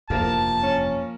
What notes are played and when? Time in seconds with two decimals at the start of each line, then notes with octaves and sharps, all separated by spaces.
0.10 F1 E2 G2 F3 A#3 A#4 A5
0.63 C#4